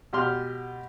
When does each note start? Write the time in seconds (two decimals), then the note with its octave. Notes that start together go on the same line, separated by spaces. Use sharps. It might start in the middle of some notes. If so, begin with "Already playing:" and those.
0.13 B2 G4 C6 F6